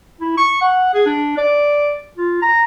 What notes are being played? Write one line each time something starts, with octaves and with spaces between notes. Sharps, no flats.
E4
C#6
F#5
G#4
D4
D5
F4
A#5